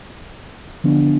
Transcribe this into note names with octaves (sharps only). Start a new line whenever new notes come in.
D3 F3 B3 D4